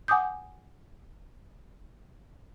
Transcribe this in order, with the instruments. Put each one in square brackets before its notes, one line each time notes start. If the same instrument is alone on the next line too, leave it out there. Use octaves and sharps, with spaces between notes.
[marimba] F#5 G#5 D6 D#6 G6